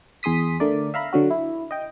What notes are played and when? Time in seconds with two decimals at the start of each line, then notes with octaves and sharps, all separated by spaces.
0.23 E2 G#4 C6 D#6 B6
0.60 D3 A3 A#4 D5
0.94 E5 F5 A#5 B5
1.13 D3 F#3 F#4
1.30 E4
1.71 D#5 G5